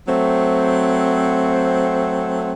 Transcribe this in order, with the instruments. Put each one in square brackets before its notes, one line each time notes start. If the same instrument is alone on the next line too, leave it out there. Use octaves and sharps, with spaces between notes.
[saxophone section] F#3 A3 C4